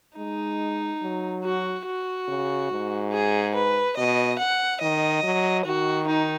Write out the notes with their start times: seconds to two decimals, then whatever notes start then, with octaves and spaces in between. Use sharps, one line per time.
0.17 G#3 D#4
1.02 F#3
1.44 F#4
1.86 F#4
2.28 C#3
2.71 G#2
3.13 G#4
3.55 B4
3.97 B2 D#5
4.39 F#5
4.81 D#3 D#5
5.23 F#3
5.65 D#3 F#4
6.08 D#4